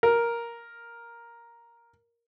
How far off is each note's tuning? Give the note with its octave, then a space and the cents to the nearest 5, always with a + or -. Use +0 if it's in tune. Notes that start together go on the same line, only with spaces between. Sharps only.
A#4 +5